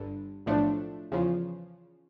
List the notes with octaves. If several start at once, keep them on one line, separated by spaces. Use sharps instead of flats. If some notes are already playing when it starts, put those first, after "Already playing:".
Already playing: G1 G2 D3
B1 A2 F3 A3 D4
E2 C#3 F3